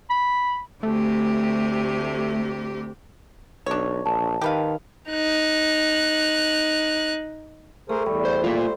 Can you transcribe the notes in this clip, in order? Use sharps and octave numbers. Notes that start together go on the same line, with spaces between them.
B5
D2 C3 A3 G4
B1 D4 C#5
A#1 A5
D#3 G4 B4 F5
D#4 F#6
A3 G#4 A#4 C5
E2 G3
C5
A#3 F4
C5